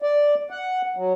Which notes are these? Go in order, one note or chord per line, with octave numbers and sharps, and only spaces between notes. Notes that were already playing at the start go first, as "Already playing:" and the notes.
D5
F#5
F#3